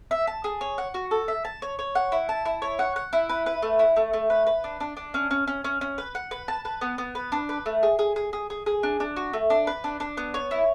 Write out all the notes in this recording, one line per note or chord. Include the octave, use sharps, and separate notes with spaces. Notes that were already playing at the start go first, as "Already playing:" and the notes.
E5
A5
G#4
C#5
F#5
F#4
A4
E5
A5
C#5
C#5
F#5
E4
A5
E4
C#5
F#5
F#5
E4
B4
B4
A3
E4
A3
A3
B4
B4
D4
D4
D4
C#4
C#4
C#4
C#4
C#4
B4
F#5
B4
A5
B4
B3
B3
B4
D4
B4
A3
G#4
G#4
G#4
G#4
G#4
G#4
D4
D4
F#4
A3
D4
B4
D4
D4
B3
C#5
E4